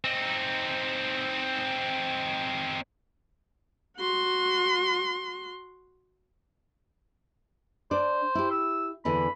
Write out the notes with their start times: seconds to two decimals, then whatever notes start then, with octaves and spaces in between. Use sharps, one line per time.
0.05 C4 D#4
3.97 F#4 C6
7.91 D4 C5 D5
8.35 E4 G4
8.51 E6
9.05 E2 D3 E3 B5